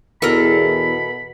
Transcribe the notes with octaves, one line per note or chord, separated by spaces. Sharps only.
E2 B2 A4 A#4 B5